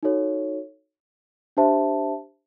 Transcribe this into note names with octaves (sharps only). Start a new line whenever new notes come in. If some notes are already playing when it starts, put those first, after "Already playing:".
D#4 F#4 A4 C#5
D4 G4 C5 E5 A5